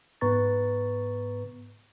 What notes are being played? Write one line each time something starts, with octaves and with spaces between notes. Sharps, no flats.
G#2 B3 B4 A#5 C#6 A6